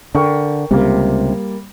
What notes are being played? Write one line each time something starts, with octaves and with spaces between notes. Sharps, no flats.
D3 A#4 G5 C#6
C#2 C3 G3 A#3